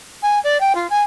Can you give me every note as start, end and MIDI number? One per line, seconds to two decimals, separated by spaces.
0.22 0.39 80
0.44 0.60 74
0.60 0.75 79
0.75 0.87 65
0.90 1.01 80